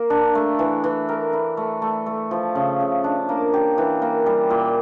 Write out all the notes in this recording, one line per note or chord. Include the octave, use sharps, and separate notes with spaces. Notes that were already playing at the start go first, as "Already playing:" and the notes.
Already playing: A#3
D4
A3
E3
E3
A#4
E4
A3
A3
A3
F3
C#3
C#3
D4
A#3
G4
E3
A#3
G3
A#2